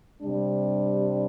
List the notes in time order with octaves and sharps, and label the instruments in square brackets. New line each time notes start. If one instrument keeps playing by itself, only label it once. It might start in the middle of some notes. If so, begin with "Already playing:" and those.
[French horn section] C3 G3 D4